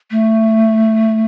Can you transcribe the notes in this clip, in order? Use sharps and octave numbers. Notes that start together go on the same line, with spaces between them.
A3